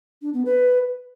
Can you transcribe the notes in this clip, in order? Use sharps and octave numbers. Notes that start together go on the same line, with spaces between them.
D4
B3
B4